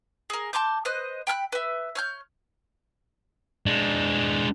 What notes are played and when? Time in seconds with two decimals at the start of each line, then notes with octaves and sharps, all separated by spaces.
0.30 G#4 A#4
0.53 A5 C6 D6 G6
0.85 B4 C5 D#5 F#6
1.27 G5 B5 F6 F#6
1.52 B4 E5
1.95 C#5 F6 G6
3.66 G#3 D4